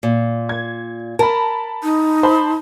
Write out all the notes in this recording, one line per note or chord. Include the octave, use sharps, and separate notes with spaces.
A#2
G#6
A#4 A5 B5
D#4
C5 A5 B5